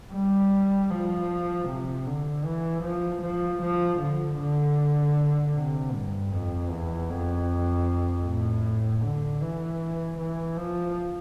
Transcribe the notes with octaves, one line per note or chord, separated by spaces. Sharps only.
G3
F3
C3
D3
E3
F3
F3
F3
D3
D3
C3
G2
F2
E2
F2
A2
D3
E3
E3
F3